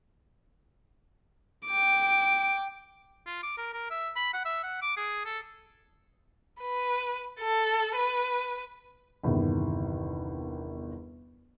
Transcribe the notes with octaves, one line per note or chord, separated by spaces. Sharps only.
G5 D6 D7
F4
D6
A#4
A#4
E5
B5
F#5
E5
F#5
D6
G#4
A4
B4
A4
B4
G1 E2 C3 D#3